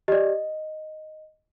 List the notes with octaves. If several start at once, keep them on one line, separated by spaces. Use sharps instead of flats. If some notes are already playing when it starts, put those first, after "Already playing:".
G4 D5 D#5